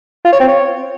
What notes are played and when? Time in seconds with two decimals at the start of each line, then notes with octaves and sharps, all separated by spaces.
0.25 F4
0.32 C#5
0.40 C4
0.48 C#5